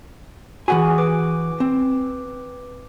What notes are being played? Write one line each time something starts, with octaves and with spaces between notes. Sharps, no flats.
E3 F#4 G#4 F#5 G#5
B4 D6
C4